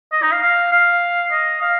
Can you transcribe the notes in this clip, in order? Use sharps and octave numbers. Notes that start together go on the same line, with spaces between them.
D#5
D#4
F5
F5
F5
D#5
F5